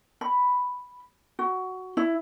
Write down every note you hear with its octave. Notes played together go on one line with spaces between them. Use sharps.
B5
F#4
E4